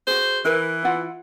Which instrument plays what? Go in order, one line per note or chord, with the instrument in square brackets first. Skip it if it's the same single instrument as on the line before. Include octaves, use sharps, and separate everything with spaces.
[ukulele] F#4 G#4 [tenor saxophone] C5
[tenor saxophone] E3 [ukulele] E4 A#4 B4
[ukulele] E4 F4 F#5